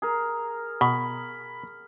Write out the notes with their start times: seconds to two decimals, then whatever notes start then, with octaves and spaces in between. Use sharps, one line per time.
0.02 G#4 A#4
0.81 B2 B5